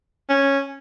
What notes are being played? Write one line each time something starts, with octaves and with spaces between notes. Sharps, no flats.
C#4